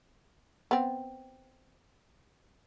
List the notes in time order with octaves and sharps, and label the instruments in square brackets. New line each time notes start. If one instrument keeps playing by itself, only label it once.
[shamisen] B3 C4